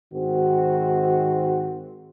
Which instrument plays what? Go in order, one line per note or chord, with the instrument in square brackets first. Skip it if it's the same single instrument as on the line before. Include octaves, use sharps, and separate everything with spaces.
[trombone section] G#2 D#3 C4 F#4